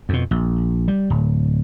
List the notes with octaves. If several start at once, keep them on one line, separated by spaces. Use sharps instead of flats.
F2 B2
A#1
G3
D1